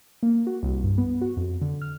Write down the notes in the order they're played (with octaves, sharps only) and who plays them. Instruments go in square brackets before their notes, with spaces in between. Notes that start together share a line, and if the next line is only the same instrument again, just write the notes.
[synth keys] A#3
F#4
C2
G2
B3
F#4
F2
D3
F6